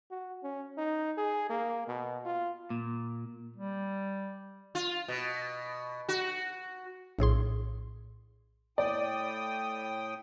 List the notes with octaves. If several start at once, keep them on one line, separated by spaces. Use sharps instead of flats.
F#4
C#4
D#4
G#4
A#3
B2
F4
A#2
G3
F4
B2
F#4
A#1 A2 G#4 C6
A2 D5 G5 D#6